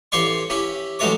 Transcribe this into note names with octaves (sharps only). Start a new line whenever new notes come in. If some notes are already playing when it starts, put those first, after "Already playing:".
A1 G4 C#5 D5 C6 C#6
C#4 E4 G4 B5
A1 F#3 G#3 A3 C#5 D6